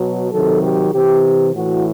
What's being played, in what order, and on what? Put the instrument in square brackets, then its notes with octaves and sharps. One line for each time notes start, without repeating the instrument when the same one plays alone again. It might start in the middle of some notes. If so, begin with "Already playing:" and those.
Already playing: [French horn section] B2 F#3
C3 D#3 F#3 A4
G4
C3 E3 G4
A2 E3 F#4